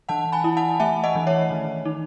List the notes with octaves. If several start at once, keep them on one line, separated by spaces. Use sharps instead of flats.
E3 F#5 A5
G#5 B5
E4
F#5 A5
A3 E5 G#5
D#5 F#5
E3
C#5 E5
D#3
D#4